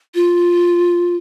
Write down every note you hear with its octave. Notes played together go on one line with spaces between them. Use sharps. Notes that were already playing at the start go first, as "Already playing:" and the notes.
F4